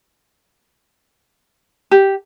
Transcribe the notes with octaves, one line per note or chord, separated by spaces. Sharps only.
G4